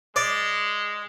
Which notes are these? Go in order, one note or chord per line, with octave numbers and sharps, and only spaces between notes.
G#3 D5